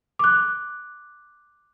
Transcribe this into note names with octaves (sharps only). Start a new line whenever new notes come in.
D6 F#6